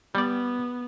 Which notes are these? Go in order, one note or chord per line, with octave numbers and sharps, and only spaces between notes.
G3 B3 D5